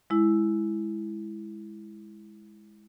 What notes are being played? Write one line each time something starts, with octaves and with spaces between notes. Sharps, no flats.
G#3 E4